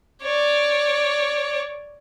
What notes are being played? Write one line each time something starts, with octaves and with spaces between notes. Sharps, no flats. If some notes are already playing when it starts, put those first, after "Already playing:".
C#5 D5